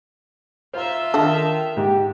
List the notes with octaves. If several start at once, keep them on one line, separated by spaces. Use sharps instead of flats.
F4 C5 E5 F5 A#5
D#3 D4 A4 D#5 F5 F#5
G#2 G4